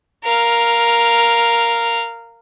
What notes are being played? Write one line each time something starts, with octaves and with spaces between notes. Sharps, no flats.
A#4 F5